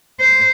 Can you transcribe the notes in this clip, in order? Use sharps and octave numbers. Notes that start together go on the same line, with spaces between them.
C5